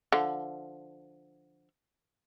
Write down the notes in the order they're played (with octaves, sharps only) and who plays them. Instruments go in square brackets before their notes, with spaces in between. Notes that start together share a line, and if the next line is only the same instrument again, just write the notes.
[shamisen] D3 F3